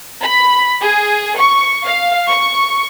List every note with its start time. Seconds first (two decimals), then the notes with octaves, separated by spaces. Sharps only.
0.23 B5
0.82 G#4
1.36 C#6
1.84 F5
2.30 C#6